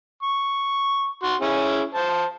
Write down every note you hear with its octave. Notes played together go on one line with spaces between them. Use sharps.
C#6
F#4 C6
C#4 E4 G#4
C5 A5